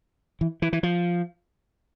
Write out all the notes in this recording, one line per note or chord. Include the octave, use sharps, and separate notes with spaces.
E3
E3
E3
F3